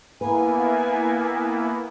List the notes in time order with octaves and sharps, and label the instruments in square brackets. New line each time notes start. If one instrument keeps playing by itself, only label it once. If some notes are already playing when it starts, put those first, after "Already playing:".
[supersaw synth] A#3 B3 E4 [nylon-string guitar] B4 [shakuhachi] G#5